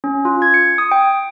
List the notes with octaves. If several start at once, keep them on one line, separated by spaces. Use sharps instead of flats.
C#4
F4
G#6
C#7
D#6
G5